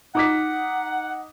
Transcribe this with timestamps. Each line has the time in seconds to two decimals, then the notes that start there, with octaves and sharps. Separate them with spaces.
0.15 D#4 F#5 D6 B6